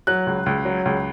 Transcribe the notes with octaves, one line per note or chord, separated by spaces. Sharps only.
F#3 F#6
C#2
C#2
F#3
C#2